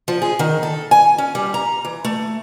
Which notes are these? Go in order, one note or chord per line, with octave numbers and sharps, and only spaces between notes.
F3
G#4
D#3
A4
G#5
C#4
G3
A#5
E3
A3